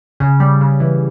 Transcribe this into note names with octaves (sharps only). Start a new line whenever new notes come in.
C#3
G3
C#3
E3